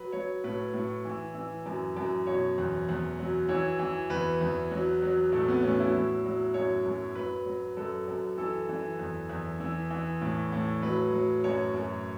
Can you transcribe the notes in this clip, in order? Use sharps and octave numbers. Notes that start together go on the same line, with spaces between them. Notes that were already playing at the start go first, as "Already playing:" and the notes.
Already playing: F#3 B4
F#3 C#5
A2 B4
A2
E3
E3
F#2
F#2
B2 C#5
E2
E2
F#3
E3 C#5
E3
E2 B4
E2
F#3
F#3
A2 A3
B3
A2 C#4
E4
F#3
F#3
F#2 C#5
F#2
F#3 B4
F#3
F#2 A4
F#2
E3 A4
E3
E2
E2
E3
E3
A2
A2
F#3 B4
F#3
F#2 C#5
F#2